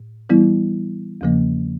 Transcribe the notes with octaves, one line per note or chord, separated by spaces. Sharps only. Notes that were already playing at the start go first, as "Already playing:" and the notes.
Already playing: A2
E3 G3 B3 E4
E2 C#3 F3 A#3